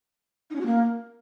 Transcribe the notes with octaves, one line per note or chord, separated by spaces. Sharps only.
D#4
C#4
F#4
A#3